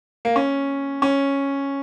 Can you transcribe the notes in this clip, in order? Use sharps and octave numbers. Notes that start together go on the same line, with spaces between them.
A#3
C#4
C#4